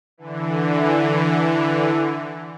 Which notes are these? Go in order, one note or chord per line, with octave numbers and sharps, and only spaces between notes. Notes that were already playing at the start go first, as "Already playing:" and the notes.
D3 E3